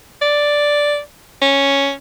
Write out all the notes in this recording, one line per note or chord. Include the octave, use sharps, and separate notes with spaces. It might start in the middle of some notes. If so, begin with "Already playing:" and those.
D5
C#4